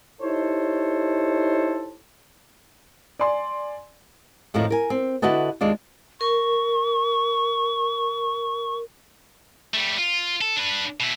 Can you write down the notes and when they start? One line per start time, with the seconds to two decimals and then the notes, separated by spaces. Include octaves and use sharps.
0.22 D#4 E4 G4 A4 C5 C#5
3.19 D5 G#5 C6
4.54 F2 A2 D#3 F3 A#4
4.70 A#4 G#5
4.90 C4
5.22 D3 E4 F#4 B4 D#5 A5
5.61 D#2 G#3 D4 F4
6.21 A#4 C#6
9.74 G3 A3
9.98 F4
10.41 A4
10.56 D4 B4
11.00 B2 E4